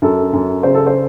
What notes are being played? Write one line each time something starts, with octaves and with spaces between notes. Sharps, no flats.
F#2 A4
F#2
C#3 C5
A4
C5